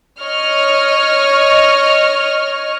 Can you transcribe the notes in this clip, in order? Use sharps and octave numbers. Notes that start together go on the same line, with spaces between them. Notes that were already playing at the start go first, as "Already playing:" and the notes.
C#5 D#5 C#6 F6